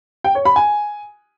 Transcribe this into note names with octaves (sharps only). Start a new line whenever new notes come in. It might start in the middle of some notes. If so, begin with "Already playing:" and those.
G5
C#5
B5
G#5